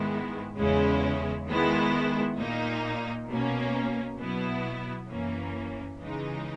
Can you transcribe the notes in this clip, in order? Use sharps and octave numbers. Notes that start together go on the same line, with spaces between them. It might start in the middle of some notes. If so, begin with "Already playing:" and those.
Already playing: G#2 D#3 G#3 B3 E4
E2 C#3 G#3 C#4 E4
D#3 G#3 B3 E4
A#2 A#3 D#4
B2 A#3 C#4
B2 F#3 B3 E4
F#2 E3 A#3 C#4
C#3 E3 G#3 D#4